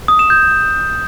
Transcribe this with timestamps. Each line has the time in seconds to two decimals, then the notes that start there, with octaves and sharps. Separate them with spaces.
0.08 D#6
0.19 E7
0.30 G6